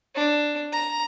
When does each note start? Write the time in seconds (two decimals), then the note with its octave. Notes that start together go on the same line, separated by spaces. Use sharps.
0.15 D4
0.72 A#5